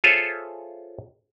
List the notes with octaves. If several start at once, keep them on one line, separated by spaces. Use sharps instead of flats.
F4 G#4 A4 C5 C#5 E5